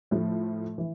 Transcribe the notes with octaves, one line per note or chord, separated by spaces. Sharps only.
A2 F3 A3
E3